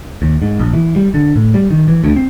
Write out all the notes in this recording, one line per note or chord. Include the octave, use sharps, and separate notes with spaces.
D#2
G#2
A#1
E3
G3
D3
A2
G3
D#3
E3
D2
C4